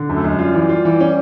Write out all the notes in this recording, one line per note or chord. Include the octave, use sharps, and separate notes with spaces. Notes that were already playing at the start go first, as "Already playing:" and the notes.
Already playing: D3
F#2
A3
F#2 G#3
G3 F4
E3
F4
E3
C#4